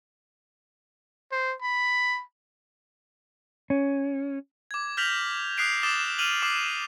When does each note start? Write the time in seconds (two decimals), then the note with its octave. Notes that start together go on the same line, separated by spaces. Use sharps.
1.32 C5
1.61 B5
3.70 C#4
4.71 D6 G#6
4.97 F6 G6 A#6 B6 F7 F#7
5.57 D#6 F#6 B6 C7 D7 F7
5.83 D6 D#6 G6 A6 E7 G7
6.18 F6 D#7 F7 F#7
6.42 D6 C7 E7 F#7